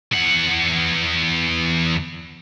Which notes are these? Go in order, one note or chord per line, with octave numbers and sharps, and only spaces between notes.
E2 F#5